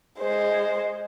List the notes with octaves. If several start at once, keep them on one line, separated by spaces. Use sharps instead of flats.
G#3 C5